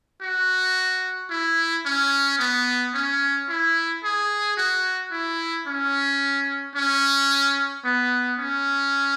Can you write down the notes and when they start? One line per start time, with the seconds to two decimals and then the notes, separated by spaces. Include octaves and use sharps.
0.21 F#4
1.30 E4
1.85 C#4
2.39 B3
2.94 C#4
3.48 E4
4.03 G#4
4.57 F#4
5.11 E4
5.67 C#4
6.75 C#4
7.84 B3
8.39 C#4